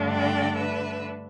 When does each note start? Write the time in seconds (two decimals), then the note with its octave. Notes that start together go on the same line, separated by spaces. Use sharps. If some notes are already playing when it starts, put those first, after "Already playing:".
Already playing: G2 D3 A3 D4
0.11 D5 G5
0.57 B4 E5